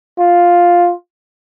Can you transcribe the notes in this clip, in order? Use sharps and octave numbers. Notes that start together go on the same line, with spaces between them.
F4